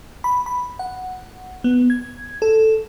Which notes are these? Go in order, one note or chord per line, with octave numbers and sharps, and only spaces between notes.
B5
B5
F#5
B3
G#6
A4